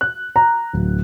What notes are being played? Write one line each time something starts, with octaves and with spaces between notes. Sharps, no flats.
F#6
A#5
D1